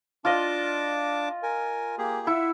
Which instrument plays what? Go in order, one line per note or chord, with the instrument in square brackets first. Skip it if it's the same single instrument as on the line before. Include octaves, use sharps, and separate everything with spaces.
[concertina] D4 A5 D6 [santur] F4 D#5
[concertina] A#4 G#5
A#3 G4 G#4
[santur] E4 [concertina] E5 F#5